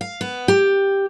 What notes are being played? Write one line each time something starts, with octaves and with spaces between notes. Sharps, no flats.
F5
B3
G4